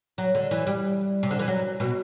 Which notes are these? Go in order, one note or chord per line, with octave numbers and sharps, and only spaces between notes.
F#3
D3
E3
G3
C3
D3
E3
F#3
B2